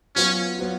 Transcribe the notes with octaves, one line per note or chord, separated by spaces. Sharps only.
F#3 B3 C#4 F4
F#3 B3 F4